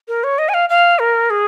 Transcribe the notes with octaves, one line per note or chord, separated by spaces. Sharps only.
A#4
C#5
D#5
G#5
F5
F5
A#4
G#4